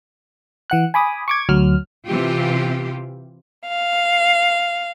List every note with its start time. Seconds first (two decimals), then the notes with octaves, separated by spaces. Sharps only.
0.70 E3 F#5 F#6
0.94 G#5 B5 D6 D#6
1.28 C#6 D6 G#6
1.49 D2 F#3 F6
2.06 C3 E3 F4 G4
3.69 F5